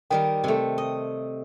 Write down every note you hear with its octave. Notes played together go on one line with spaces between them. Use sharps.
D#3 G3 A#4 G5
C3 A3
D#5